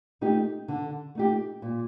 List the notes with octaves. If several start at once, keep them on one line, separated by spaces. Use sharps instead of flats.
A3 D#4 G4
D3
A3 D#4 G4
A#2